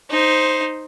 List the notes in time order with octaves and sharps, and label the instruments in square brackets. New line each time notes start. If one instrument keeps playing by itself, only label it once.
[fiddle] D#4 C5